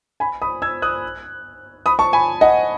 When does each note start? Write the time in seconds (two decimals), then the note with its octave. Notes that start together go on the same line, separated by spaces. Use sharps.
0.20 G#5 B5
0.42 B5 D#6
0.62 E6 G#6
0.82 D#6 F#6
1.86 B5 D#6
1.99 A5 C#6
2.13 G#5 B5
2.41 D#5 F#5